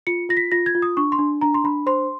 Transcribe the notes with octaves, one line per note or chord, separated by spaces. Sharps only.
F4 C#7
F4 A#6
B6
F4 A#6
G#6
F4
D#6
D4 C#6
C6
D4
D4 A#5
C6
D4 B5
C5 C6